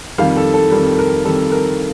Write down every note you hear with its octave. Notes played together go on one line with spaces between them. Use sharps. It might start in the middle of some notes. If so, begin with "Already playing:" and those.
F2 D#3 G3 F5
A4
A4
F2 D#3 G3 A#4
A#4
F2 D#3 G3 A4
A#4